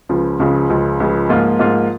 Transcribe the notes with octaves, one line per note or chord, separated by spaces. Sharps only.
C#2 C#3 F3
C#2 C#3 F3
C#2 C#3 F3
C#2 C#3 F3
G#2 F3 A#3 F4
G#2 F3 A#3 F4